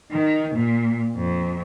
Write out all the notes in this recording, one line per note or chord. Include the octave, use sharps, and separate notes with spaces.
D#3
A#2
F2